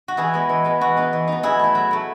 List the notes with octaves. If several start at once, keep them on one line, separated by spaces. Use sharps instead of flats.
F#4
E3 E4 G#4
G#3 B3
E3
G#3 B3
E3 F#4
B3 D#4
E3
B3 D#4
F#3 E4 G#4
A3 E4
F#3
A3 E4